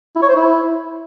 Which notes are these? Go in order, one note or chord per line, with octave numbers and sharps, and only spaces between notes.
E4
C#5
C5
E4